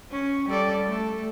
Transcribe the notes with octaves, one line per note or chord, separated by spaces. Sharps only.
C#4
G3 A4 D5
A3 A4